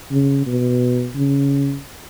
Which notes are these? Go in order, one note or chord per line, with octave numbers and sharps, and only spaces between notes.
C#3
B2
C#3